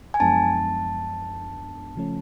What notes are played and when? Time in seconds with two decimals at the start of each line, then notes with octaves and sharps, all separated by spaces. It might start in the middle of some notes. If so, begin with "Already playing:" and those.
0.14 G#5
0.20 F#2 F3 G#3 B3 D4 A5
1.96 C#3 F3 A3 C#4